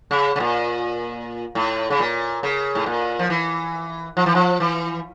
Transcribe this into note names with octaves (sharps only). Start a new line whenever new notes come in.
C#3
C#3
A#2
A2
C#3
A#2
C#3
A2
A#2
F3
E3
F3
E3
F3
E3